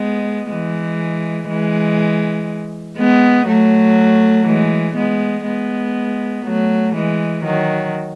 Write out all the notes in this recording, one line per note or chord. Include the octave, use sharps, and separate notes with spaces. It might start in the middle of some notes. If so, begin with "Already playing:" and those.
Already playing: G#3 B3
E3 G#3
E3 G#3
G#3 B3
F#3 A3
E3 G#3
G#3 B3
G#3 B3
F#3 A3
E3 G#3
D#3 F#3